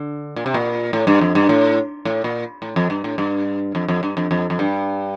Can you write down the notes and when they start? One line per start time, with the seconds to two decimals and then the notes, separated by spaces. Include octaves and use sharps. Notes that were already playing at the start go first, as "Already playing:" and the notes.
Already playing: D3
0.36 A#2
0.46 C3
0.54 A#2
0.93 A2
1.07 G2
1.21 F2
1.35 G2
1.49 A2
2.05 A2
2.24 A#2
2.62 A2
2.76 F2
2.90 G2
3.04 A2
3.18 G2
3.75 F2
3.88 F2
4.03 G2
4.17 F2
4.31 F2
4.50 F2
4.59 G2